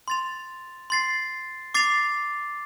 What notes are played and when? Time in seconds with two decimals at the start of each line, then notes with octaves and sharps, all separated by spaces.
0.08 C6 A6 F7
0.90 C6 A6 C7
1.74 D6 A6 C7 F7